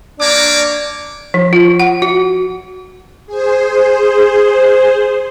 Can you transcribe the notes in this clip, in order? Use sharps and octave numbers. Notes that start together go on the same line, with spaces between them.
A#3 D4 C#5 D6
F3
F4
F#5
F#4
G#4 C5